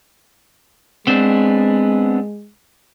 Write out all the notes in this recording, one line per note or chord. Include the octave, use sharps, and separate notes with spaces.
G#3 B3 C4 D4